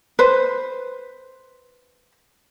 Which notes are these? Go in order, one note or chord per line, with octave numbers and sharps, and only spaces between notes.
B4 C5